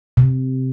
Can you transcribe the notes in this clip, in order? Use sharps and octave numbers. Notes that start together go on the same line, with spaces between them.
C3